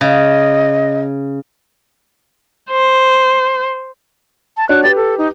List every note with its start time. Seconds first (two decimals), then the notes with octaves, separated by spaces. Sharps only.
0.01 C#3 D#5
2.71 C5
4.57 A5
4.69 D4 F#4 C#5 F#6
4.83 G4 B4 A6
4.96 A4
5.18 D#4